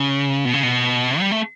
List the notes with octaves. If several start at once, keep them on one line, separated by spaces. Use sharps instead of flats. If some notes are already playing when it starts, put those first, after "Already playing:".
Already playing: C#3
B2
C#3
B2
G3
A3